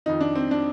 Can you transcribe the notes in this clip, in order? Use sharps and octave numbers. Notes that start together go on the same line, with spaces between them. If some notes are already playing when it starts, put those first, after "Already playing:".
F2 D#3 D#4
D4
C4
D4